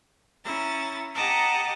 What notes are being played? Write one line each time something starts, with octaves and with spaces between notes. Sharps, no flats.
C#4 E4 A#5 A6
G4 D#5 F#5 A5 A#5 D6